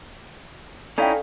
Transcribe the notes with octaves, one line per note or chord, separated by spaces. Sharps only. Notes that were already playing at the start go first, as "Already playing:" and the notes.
C#4 D#4 E4 A4 D5 F5 G5